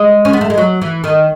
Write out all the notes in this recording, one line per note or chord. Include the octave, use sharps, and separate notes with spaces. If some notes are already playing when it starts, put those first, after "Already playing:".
Already playing: G#3
C#4
B3
A3
G#3
F#3
E3
D#3